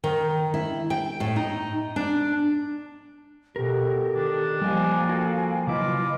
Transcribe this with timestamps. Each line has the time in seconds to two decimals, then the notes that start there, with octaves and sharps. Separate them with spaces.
0.04 D#3
0.54 E4
0.90 G5
1.20 A2
1.36 D#4
1.96 D4
3.56 B2 G4 A4 A#4
4.14 D#3 D4
4.62 F3 G3 A#3 D#5 F5 G5 G#5
5.09 F#4 A4
5.67 C#3 F#3 E4 F4 B4 D#5 D6